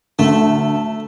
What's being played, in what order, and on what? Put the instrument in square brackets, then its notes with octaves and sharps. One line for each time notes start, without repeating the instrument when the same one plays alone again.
[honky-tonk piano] D2 [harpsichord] A3